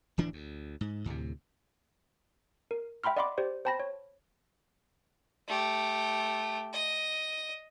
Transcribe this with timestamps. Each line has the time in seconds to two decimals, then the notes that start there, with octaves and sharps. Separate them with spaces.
0.18 D1 E3 D4
0.33 D2
0.81 G#2
1.06 D2 A2 C3
2.71 A#4
3.04 E5 G5 B5 C6 F6
3.17 D5 D#5 F#5 B5 C6 D6
3.38 G4 C5 D5
3.65 C5 G5 A5 B5 A#6
3.80 C#5
5.48 A3 G4
6.73 D#5